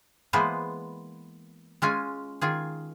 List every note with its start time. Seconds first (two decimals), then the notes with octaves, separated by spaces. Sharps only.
0.33 E3 G#3 A#3 B3 B4 C5
1.82 G#3 C#4 F4 G#5
2.41 D#3 F4 G#4